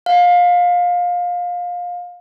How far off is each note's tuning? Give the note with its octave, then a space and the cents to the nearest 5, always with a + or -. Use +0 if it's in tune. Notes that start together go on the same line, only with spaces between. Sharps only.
F5 +25